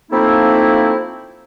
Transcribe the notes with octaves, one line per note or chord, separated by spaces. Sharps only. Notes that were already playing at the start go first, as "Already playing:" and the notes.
F3 A3 A#3 C4 D#4 E4